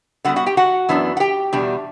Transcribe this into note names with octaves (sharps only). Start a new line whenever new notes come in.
D3 G3 B3 F#4 F#5
F#4 F#5
G4 G5
F#4 F#5
F#2 E3 B3 D4
F#5
G4 G5
E2 B2 G3 D4